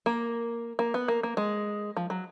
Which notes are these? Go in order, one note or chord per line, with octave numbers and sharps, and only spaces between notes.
A#3
A#3
B3
A#3
A#3
G#3
F3
F#3